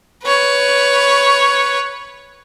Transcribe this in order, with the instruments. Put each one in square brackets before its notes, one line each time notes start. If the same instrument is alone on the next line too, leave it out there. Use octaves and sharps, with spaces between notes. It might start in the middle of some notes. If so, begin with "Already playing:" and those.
[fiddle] B4 C#5